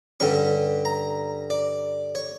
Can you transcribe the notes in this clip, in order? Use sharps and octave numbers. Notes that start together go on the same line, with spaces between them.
G2 D3 G3 C#4 C#6
A#5
D5
C#5